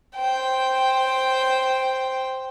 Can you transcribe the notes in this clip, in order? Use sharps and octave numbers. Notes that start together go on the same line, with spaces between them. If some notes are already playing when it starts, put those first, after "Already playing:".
C5 G5